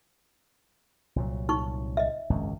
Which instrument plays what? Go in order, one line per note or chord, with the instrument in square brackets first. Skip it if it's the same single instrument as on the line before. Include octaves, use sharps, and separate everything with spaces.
[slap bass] C2 A#2 F#3
[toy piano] D#4 C#6
D#5 E5
[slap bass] G#1 C#2 F#2